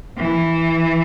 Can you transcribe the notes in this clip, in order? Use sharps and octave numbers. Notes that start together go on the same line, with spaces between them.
E3